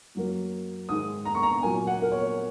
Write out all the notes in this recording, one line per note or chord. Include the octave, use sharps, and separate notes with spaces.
F#2 F#3 A#3
G#2 D#3 G#3 D#6
A#5
C#6
A#5
A#2 F#3 A#3 G#5
F#5
A#4
C#5